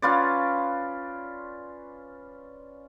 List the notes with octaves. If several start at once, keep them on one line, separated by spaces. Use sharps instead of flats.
C#4 F4 B4 D5